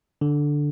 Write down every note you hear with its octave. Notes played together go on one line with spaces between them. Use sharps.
D3